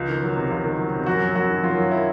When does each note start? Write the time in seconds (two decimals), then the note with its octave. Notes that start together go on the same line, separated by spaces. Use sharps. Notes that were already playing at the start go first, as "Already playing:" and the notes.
Already playing: C#2
0.09 D#3
0.22 F#3
0.36 C3
0.51 C#2
0.64 D#3
0.78 F#3
0.93 C3
1.06 F#2 F#4
1.21 F#3
1.36 F#2 F#4
1.50 D#3
1.64 F#2 F4
1.77 F#3
1.91 E4